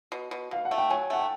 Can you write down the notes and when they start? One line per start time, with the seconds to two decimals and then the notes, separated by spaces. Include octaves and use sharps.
0.12 B2
0.31 B2
0.51 B2 F5
0.65 F#5
0.71 A3
0.78 G5
0.90 F#3 G#5
1.10 A3 F#5
1.19 G5